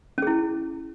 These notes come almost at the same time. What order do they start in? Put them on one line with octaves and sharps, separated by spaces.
C#4 G#4 E4